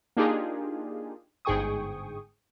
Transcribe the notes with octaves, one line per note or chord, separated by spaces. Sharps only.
A#3 D4 D#4 F4 G4 G#4
G1 G#2 G#4 G5 C#6 D#6